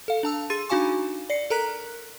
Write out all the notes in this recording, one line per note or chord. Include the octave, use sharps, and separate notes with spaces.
A4 F5
D4 A5 E6
G#4 C6 A6 D#7
D4 D#4 F#4 F5 G#5 C#6
D5 C7 C#7
A4 A#4 A#5 F#6 B6